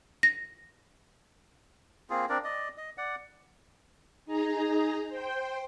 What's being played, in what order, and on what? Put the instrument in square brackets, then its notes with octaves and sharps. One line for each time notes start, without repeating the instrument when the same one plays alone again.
[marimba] A#6
[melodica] A#3 C4 F4 G#4
C4 D4 A#4 D5
D5 D#5
D#5
D5 F#5
[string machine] D#4 G#4 A#5
C5 G5